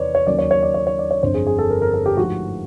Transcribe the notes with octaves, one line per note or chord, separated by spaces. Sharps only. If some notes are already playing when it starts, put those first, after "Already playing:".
Already playing: E2 C3 D#3 B4 C#5 D5
C#5
D#2 C#3 F#3 A#3 C#4 D5
C#5
C#5
D5
C#5
C#5
D5
C#5
G1 F2 D3 C5
G#4
G#4
A4
A#4
A#4
A4
G4
G#2 F3 A3 F#4